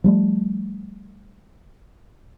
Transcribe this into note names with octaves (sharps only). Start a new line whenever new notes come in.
F3 G3 A3